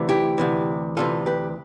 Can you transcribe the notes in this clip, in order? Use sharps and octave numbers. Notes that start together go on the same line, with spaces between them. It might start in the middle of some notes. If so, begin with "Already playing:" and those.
Already playing: D2 C3 E3
E4 G4
D2 C3 E3
D2 C3 E3 F4 A4
G4 B4